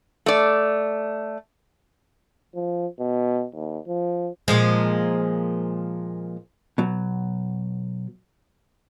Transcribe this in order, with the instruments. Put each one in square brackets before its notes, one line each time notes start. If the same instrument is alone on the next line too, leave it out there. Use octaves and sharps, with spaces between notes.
[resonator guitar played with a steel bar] A3 D5
[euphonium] F3
B2
D#2
F3
[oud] A#2 F3 G#3
[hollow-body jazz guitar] B2 F#3